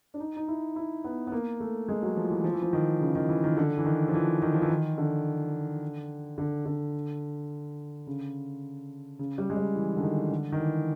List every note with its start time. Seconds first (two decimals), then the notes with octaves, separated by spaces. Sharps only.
0.14 D4
0.20 D#4
0.36 D#4
0.48 E4
0.76 E4
1.04 B3
1.27 B3
1.32 A#3
1.60 A3
1.89 G#3
2.03 F#3
2.16 F3
2.30 E3
2.44 F3
2.53 E3
2.62 F3
2.73 D#3
3.01 C#3
3.15 D#3
3.29 E3
3.44 D#3
3.57 D3
3.78 E3
3.85 D#3
4.08 F3
4.14 E3
4.42 D#3
4.54 F3
4.62 E3
4.69 D#3
4.98 D3
6.38 D3
6.66 D3
8.07 C#3
9.19 C#3
9.38 G3
9.50 G#3
9.57 G3
9.76 E3
9.96 D3
10.03 D#3
10.31 D3
10.52 D#3
10.60 E3